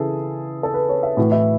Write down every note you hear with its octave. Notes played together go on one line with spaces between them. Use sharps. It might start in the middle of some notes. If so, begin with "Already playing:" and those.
Already playing: C#3 E3 E4 G#4 A4
A4
B4
C#5
E5
A2 E3 F#4
E4